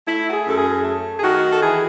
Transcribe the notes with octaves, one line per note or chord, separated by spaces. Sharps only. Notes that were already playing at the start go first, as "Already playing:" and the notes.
A3 E4
F#4
G#4
F#2 A4
G#4
A3
G#4
D#3 F#4
A4
E3 G#4